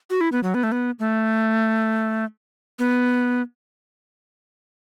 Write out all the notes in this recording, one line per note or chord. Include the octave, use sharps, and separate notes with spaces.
F#4
E4
B3
F#3
B3
A3
B3
A3
B3